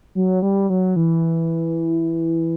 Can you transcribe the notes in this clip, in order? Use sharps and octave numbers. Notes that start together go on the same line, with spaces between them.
F#3
G3
F#3
E3